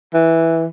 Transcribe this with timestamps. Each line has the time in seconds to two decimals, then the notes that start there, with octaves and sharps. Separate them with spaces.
0.14 E3